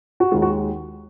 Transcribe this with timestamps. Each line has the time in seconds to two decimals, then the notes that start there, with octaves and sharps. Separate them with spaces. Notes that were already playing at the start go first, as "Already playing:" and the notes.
0.20 F#4
0.31 D#2 D#3 G#3 F4
0.42 F#4